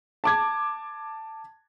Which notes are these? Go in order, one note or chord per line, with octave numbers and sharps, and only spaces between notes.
A5 D6 G#6